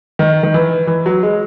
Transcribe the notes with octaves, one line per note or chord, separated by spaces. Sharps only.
D#3
D#3
E3
E3
F#3
G#3